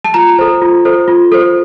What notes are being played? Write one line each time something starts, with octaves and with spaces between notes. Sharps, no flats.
A5
F4 A#5
A4 C5
F4
A4 C5
F4
A4 C5